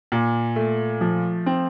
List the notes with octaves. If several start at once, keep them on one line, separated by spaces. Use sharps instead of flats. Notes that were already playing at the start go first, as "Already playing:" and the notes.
A#2
A3
F3
C4